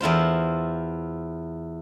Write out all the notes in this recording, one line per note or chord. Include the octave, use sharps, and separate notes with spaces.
E2 E4 F4 C5